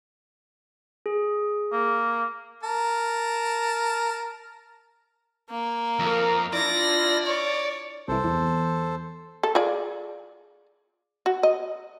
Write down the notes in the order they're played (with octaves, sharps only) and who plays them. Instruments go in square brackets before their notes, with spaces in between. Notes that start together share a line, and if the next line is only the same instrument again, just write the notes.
[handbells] G#4
[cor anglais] A#3
[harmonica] A#4 A5
[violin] A#3
[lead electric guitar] F2 [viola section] A#4 F5
[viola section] D4 E4 F4 [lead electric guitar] D5 [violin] A#6
[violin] C#5
[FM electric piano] C2 E3 [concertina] A4 C5
[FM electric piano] E2
[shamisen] A4
F4 G#4 D5
F#4
D#5